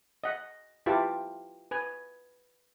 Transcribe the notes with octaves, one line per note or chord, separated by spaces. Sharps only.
D#5 F#5
E4 F4 G4 B4 A5
B4 G#5